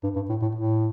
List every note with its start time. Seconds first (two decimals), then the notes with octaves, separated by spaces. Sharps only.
0.04 G2
0.16 G2
0.29 A2
0.42 A2
0.55 A2